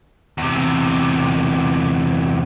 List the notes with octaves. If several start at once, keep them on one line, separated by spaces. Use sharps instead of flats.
E2 C3